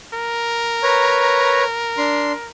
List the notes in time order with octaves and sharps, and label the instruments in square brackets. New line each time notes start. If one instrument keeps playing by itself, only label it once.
[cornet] A#4
[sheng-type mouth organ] B4 C#5 A#5
D4 C6